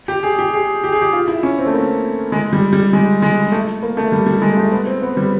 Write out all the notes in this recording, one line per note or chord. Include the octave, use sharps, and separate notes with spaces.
G4
G#4
G4
G#4
G4
G#4
G4
F4
E4
C#4
C4
A3
A#3
G#3
G3
G3
G#3
G#3
A3
A#3
A3
G3
G3
G#3
A3
B3
C4
B3
G3